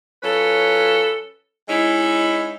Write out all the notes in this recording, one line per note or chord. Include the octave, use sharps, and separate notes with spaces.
F#3 C#4 F4 A4 B4
G#3 C#4 D#4 E4